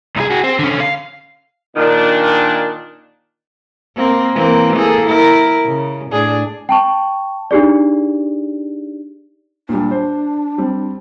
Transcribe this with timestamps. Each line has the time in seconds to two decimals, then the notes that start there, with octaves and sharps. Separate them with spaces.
0.17 C2 G#4
0.30 F#4 G#4
0.44 C4
0.59 D3 C#4
0.80 F5
1.77 A#2 D#3 D4
3.96 A#3 C4
4.33 E3 A#3 C4
4.76 A#3 G#4 A4
5.07 E4 A#4
5.66 C#3
6.11 A2 D4 G#4
6.69 G5 A5 C#6
7.51 D4 D#4 G4 G#4 D5
9.69 A#2 G3 D4
9.91 C5
10.58 G3 C4